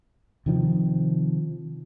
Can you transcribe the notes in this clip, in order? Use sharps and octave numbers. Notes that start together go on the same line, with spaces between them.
C3 D#3 F3